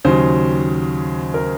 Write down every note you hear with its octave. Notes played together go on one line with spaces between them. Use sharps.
D#2 C#3 F#3 C5
A#4